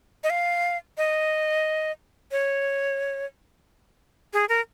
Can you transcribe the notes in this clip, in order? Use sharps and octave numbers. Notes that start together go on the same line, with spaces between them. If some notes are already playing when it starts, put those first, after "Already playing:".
D#5
F5
D#5
C#5
G#4
A#4